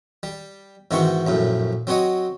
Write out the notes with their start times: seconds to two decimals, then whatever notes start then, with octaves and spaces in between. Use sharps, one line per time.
0.23 G3
0.91 G#2 D#3 E3 C4 F#4 C#6
1.27 A#1 F#2 A2
1.87 F#3 C4 F#4 C#5 D#5